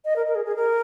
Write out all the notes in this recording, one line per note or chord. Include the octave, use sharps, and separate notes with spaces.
D#5
A#4
A#4
G#4
G#4
A#4